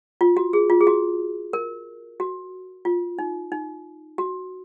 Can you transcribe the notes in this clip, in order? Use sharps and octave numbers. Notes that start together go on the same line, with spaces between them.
F4
F#4
G#4
F4
G#4
F#4
A#4
F#4
F4
D#4
D#4
F#4